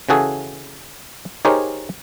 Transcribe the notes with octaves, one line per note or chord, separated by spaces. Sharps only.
C#3 E3 F#4 G#4 A4
D#4 G4 G#4 A#4 C5 C#5